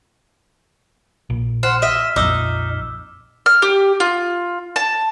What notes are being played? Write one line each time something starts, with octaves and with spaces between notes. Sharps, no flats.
A#1
C5 F#5 F6
D#5 E5 F6 B6 E7
A#1 F2 D#4 D6 E6 G7
F6
G4
F4
A5